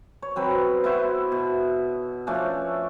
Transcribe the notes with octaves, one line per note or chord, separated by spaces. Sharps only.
C#5
F#3 C4 B4
B3 E4 F#4 C5
B2
F3 A3 C#4 D4